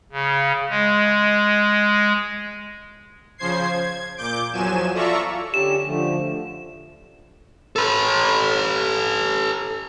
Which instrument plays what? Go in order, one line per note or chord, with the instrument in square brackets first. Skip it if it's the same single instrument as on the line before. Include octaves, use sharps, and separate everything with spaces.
[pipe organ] C#3
G#3
[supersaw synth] C#3 F3 C5 G#6 C7
G#6
A#2 D6 G6 D7
E2 F3 F#3 G#5 E7
F4 A4 D5 E5 A#5 C#6
[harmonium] D3 C#4 G4 [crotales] E7
[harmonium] D3 F3 A3
[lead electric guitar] A4 B4